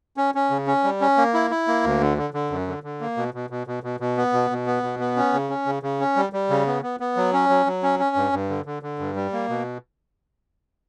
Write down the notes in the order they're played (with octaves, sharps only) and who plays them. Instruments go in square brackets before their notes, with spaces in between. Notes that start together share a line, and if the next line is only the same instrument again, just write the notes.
[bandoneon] C#4
C#4
C#3
C#4
G3
C#4
A#3
E4
E4
A#3
D2
D3
D3
D3
F#2
D3
D3
A#3
B2
B2
B2
B2
B2
B2
B3
B2
B2
B3
B2
B3
C#4
C#3
C#4
C#3
C#3
C#4
G3
G3
C#3
B3
B3
B3
F#3
C#4
F#3
F#3
C#4
C#4
G2
G2
D3
D3
D3
G2
G3
A#3
B2